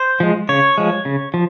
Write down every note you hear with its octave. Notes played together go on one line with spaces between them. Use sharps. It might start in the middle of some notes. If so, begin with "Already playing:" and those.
Already playing: C5
F3 G#3
C#3 C#5
F3 G#3
C#3
F3